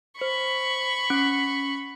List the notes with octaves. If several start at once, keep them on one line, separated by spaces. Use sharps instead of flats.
C5 B5 C#6 C#7
C#4